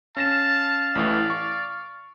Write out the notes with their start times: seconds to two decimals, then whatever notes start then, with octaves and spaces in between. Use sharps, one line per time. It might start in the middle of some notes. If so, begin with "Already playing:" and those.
0.17 C#4 F5 A5 A#6 E7
0.95 A1 A2 E3 D5
1.30 C#6